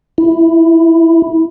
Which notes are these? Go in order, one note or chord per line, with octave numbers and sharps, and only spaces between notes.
E4